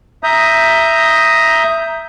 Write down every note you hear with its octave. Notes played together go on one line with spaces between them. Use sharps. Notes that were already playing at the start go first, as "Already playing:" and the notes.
E5 A#5 D#6 G6